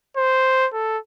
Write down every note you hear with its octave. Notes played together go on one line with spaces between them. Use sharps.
C5
A4